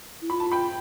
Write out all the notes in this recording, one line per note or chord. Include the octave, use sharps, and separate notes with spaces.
E4
F4 B5
A5
G5 B5